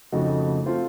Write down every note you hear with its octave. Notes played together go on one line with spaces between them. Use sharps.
F2 C#3 A3 D#4 F#4
A3 C4 F4 C5